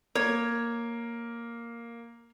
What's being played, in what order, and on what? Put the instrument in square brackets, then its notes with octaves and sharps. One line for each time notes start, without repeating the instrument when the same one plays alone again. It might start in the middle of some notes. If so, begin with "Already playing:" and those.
[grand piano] A#3 [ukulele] C#5